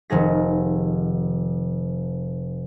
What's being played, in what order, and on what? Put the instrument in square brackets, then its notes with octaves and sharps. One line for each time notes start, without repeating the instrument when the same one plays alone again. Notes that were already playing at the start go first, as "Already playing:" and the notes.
[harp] F1 C3 D#3 G#4 A#6